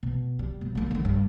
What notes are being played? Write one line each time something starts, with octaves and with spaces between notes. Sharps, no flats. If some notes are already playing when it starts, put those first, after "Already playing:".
B2
G3
B2
G3 A#3
D3 D#3
G2